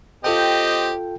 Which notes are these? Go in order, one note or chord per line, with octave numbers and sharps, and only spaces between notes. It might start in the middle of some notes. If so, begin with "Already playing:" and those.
C4 F4 G4 A4 D#5 G5